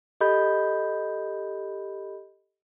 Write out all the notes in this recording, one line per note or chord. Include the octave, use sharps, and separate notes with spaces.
G4 A4 D#5 B5 G6